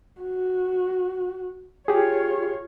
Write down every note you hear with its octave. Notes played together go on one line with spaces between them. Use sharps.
F#4
F4 G4 G#4 C#5